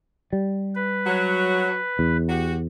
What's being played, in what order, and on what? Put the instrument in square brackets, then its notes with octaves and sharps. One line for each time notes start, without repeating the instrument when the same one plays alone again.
[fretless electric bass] G3
[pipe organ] B4
[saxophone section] F#3
[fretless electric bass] E2
[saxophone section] F#4 G4